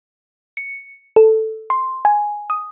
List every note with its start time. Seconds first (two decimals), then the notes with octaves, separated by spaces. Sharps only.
0.57 C#7
1.16 A4
1.70 C6
2.05 G#5
2.50 D#6